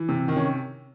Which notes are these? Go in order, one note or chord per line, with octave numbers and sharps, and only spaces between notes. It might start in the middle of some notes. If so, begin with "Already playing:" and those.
Already playing: E3
C3
D#3
C#4